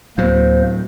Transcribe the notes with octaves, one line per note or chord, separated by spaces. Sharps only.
D2 A2 F#3 A#3 C5